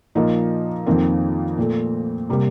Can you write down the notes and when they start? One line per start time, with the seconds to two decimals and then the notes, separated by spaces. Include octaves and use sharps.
0.15 A#2 F3 A#3 D#4
0.87 F2 D#3 A#3 C4
1.58 A#2 A3
2.29 C3 G3 A#3